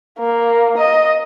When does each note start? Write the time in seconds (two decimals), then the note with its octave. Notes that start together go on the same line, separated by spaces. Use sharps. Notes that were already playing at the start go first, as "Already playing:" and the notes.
0.19 A#3
0.78 D#5